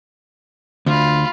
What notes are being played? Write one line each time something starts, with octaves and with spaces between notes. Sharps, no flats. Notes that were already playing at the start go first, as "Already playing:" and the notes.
D2 F4 B5